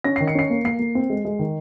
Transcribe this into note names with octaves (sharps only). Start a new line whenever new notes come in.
C#4 A#6
D#3 C7
C#7
C#4 C7
A#3
A#3 C7
A#3
C4
G#3
G#3
D#3